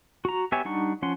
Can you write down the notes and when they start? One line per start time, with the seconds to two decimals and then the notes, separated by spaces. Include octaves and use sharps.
0.25 F#4 A#5
0.52 B3 G4 C#5 E5 G#5
0.65 G3 D4 D#4 F#5 C#6
1.02 F3 C#4 F#5 C6